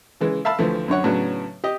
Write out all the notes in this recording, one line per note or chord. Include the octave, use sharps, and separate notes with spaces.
C#3 E3 G#3
E5 F5 A5 B5 E6
D2 E3 F3 A3
F#2 D3 C#5 F#5
A2 C#3 F#3 B3 D4
G4 D#5